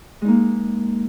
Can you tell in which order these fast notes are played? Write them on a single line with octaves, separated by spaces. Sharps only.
G#3 D#4 A#3